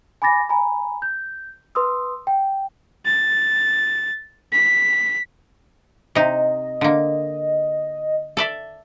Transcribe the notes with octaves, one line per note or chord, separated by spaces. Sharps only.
G#5 B5 D6 A6 A#6
G#5 A#5 B5
G6
B4 C6 D#6 E6
G5
A6
B6
C3 D#4 D#5
D3 A#3
A4 D5 E5